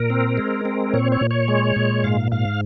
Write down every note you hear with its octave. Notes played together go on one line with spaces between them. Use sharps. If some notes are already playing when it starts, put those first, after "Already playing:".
Already playing: A#2 A#4
C4
G#3
C4
A#2 C#5
C#5
A#2
C#5
G#3
A#2
G#2 F5
G#2 F5